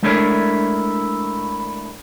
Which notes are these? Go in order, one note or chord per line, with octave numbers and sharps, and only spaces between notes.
G#3 A3 D4 E4 A#4 C#5